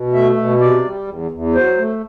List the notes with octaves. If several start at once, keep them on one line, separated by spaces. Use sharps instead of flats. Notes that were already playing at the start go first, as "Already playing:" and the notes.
Already playing: B2
A3 E5
B2
C3 D5
G3
E2
E2
F#3 C5
A3